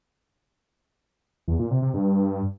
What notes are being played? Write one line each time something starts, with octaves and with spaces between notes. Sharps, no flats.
E2
A#2
C3
C3
G2